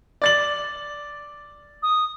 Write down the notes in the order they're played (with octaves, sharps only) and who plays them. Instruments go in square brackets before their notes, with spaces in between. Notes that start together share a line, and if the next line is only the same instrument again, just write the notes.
[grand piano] D5 A6 F#7
[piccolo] D#6